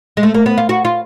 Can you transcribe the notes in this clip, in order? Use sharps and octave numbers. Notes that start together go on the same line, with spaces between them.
G#3
A3
A#3
B3
F4
F#4
F4